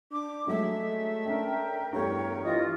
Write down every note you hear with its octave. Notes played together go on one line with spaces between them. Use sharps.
D4 D6
F#3 G#3 A3 E5
C#4 D4 A#4 G5
E2 G2 A3 C#5
E3 F4 D#5 D#6